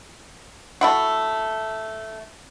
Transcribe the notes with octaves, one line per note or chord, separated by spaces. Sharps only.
A3 E4 F#4